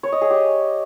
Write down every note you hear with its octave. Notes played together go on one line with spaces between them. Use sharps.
C#5
D#5
G#4
G4